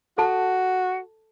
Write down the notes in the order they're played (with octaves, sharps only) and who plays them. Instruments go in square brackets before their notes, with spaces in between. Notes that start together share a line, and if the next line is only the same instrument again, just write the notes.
[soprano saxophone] F#4 [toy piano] A4 A5